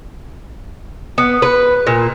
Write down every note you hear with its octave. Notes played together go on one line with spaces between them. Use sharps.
B3
B4
A#2